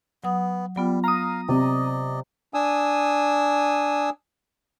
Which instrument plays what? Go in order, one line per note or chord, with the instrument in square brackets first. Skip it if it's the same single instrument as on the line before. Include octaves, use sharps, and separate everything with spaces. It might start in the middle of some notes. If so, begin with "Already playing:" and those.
[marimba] F#3 F#5 D#6 [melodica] B3
[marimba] F#3 B3 F4 [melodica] G3
[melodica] F5 [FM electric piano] A#5 D#6
[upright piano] C3 [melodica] D5 D#5
[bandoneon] D4 G#5 D#6 E6